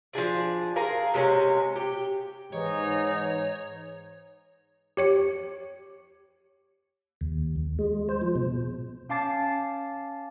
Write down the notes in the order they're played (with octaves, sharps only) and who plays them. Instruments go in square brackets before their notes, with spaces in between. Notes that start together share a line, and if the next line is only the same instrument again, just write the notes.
[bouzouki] F3 D4 G#4 D5
G#4 A#4 F5
C3 G#3 C4 C#4
G4
[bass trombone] G#2 [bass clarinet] E3 [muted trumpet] D#4 [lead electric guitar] C#5
[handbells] G4 C#5 C#7
[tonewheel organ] D#2
G#3
C5
F3
B2
[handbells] C#4 F5 A5 D6 A6 C7